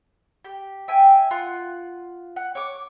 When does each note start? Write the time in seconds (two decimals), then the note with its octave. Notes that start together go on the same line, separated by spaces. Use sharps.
0.45 G4
0.88 E5 G5 G#5
1.31 F4 F#5
2.36 F#5
2.55 C#5 D6